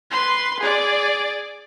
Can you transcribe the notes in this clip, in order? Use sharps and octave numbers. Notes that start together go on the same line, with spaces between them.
B4 C6
G#4 D5